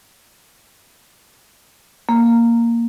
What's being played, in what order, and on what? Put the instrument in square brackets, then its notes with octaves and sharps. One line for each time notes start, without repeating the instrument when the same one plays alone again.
[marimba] A#3